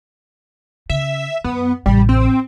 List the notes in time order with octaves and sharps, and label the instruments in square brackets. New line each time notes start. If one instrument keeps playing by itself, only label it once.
[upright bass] C#3 [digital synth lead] E5
[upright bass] F#2 [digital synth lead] B3
[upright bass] A1 C3 [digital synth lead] G3
[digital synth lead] C4